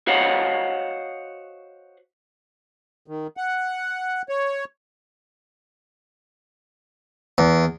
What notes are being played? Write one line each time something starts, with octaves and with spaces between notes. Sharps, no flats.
F#4 C5 C#5 D#5 F5 F#5
D#3
F#5
C#5
E2